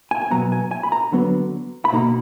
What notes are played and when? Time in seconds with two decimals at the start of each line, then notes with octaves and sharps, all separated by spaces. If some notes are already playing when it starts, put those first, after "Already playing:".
0.11 G#5
0.22 G#5
0.31 B2 F#3 B3 A#5
0.52 G#5
0.71 G#5
0.83 B5
0.92 A#5
1.12 D3 F#3 B3
1.85 B5
1.93 B2 A#3 D#4 A#5